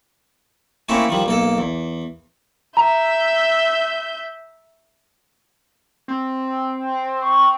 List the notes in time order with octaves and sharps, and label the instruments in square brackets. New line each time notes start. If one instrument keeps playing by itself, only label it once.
[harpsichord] A3 A#3 C4 C#4 E4 A4
D#3 F3 G3
B1 A#3 A4
E2
[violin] E5 G6 [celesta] A#5
[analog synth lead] C4
[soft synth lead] C#6